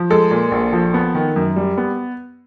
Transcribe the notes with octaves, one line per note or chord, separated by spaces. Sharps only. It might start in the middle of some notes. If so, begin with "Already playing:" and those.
Already playing: F3
G#3 A4
A#2
A#1
F3
B3
D#3
F#2
G3
B3